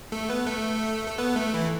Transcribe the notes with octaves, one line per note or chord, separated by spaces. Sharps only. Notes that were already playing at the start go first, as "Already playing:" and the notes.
A3 A4
B3 B4
A3 A4
A4
B3 B4
A3 A4
E3 E4